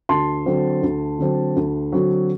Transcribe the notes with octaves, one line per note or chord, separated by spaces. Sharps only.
D2 A5 C6
D3 F#3 C4
D2
D3 F#3 C4
D2
D3 F#3 C4